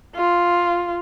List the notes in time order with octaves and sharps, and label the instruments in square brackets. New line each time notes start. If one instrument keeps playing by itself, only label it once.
[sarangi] F4